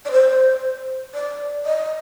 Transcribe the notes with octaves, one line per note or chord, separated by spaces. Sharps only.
D5
C5
D5
D#5